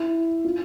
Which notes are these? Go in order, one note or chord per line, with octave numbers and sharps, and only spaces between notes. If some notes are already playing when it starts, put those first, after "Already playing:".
Already playing: E4
F4